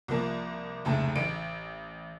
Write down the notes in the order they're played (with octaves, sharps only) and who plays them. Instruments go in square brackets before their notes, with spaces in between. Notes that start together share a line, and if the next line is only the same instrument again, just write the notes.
[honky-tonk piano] C2 F3 A#3 A5
F1 C#2 A2 A5
A1 D7